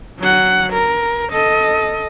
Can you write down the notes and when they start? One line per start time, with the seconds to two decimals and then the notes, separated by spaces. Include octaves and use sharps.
0.19 F#3 F#5
0.73 A#4
1.32 A4 D#5